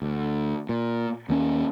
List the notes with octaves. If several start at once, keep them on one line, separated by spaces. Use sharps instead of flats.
D2
A#2
D#2 A#3 C#4